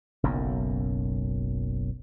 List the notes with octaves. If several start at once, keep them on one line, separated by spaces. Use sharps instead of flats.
F#1 B1 F#2